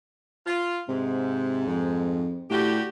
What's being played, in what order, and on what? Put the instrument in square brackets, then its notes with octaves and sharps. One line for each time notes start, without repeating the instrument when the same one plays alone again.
[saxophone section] F4
[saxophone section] G#2 [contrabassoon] C3
[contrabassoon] F2
[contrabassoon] A2 [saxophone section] D3 F#4 G4